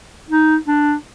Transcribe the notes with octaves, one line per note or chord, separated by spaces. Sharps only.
D#4
D4